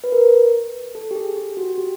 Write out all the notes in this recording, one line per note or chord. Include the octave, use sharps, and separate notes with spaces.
B4
A#4
A4
G4
G#4
G4
F#4
G4